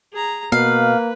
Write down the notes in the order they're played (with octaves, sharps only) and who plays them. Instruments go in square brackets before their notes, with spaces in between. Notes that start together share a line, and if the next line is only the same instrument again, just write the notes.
[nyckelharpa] G#4 A#5
[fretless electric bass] B2 [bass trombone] A#3 [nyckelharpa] B4 [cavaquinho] F5